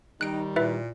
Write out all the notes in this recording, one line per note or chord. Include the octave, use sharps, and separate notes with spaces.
D#3 G3 D#4 F#6 D7
A#2 E4 B4 E5